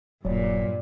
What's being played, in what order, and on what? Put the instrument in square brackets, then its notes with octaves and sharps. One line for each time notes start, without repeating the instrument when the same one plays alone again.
[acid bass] D#1 [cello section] G2 A#2 [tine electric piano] F#3 C#5 [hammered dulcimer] D5